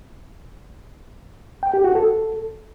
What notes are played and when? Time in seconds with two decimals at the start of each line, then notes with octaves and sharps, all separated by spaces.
1.63 G5
1.74 G4
1.84 F#4
1.95 A4